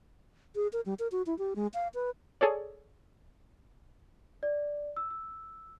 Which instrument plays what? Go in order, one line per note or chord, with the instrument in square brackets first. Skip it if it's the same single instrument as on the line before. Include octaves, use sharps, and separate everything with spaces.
[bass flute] G#4
A#4
G3
A#4
F#4
E4
G4
G#3
F5
B4
[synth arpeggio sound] G#4 A4 C#5 D5
[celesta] D5
E6
E6